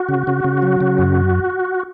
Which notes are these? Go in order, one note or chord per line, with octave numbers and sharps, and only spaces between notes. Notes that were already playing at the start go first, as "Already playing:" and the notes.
Already playing: F#4
C#3
C#3
C#3
F#3
C#3
F#2